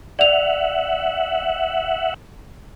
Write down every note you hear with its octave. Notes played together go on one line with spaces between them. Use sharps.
D5 E5 F#5 F7